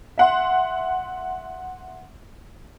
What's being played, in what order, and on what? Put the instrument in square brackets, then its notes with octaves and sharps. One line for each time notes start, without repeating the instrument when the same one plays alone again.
[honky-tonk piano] E5 F#5 C6